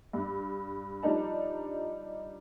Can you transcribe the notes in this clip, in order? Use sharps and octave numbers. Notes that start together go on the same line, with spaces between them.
G2
F3 G3 D4 D#4 A5